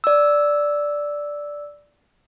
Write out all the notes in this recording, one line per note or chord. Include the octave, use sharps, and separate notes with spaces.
D5 E6